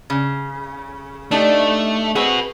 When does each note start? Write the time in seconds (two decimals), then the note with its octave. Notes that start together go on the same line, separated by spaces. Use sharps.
0.10 C#3
1.31 A3 D4 D#4 G4
2.16 C4 F#4 G#4 B4